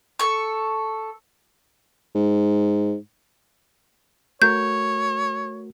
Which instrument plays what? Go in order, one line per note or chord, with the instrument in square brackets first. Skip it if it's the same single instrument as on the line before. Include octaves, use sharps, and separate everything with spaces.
[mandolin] A4 C#6
[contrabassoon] G#2
[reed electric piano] A3 F#4 A#4 [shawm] C#5 [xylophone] G6